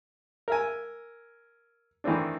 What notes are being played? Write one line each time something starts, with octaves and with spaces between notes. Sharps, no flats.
A#4 E5 G#5
D#3 E3 A3 C4 D4